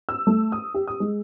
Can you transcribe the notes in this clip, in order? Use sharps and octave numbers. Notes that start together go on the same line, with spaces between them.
E6
A3
D#6
G4
D#6
G#3